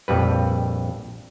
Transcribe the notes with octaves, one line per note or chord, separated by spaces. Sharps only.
A#1 F2 G3 B4